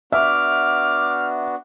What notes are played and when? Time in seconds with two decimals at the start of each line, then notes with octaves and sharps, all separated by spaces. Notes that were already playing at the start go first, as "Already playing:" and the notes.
0.12 B3 D4 F#4 E5 D6 F6